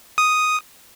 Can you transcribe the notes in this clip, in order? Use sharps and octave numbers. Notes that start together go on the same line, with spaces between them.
D#6